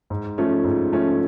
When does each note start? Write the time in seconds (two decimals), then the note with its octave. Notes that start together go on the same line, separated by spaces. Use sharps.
0.10 G#2
0.38 F3 A3 C#4
0.64 G#2
0.92 F3 A3 C#4